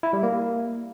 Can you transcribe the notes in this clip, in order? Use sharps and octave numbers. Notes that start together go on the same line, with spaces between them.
E4
G3
A#3